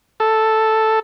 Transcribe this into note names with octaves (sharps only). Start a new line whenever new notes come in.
A4